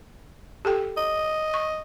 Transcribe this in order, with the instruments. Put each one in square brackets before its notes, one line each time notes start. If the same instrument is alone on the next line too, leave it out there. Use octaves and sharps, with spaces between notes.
[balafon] G4 A4 G5
[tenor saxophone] D#5
[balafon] C#6